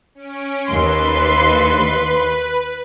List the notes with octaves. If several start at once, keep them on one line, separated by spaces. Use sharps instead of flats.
C#4 D7
D#2 B4 C6